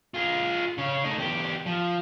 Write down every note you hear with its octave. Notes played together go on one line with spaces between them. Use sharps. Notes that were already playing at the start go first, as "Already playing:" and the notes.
F4 G#4
C#3 C#5
A3 D#4
E2 G4
F3